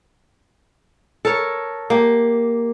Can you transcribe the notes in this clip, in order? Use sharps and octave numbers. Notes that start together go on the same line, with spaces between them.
A4 A#4 C#5
A#3 G4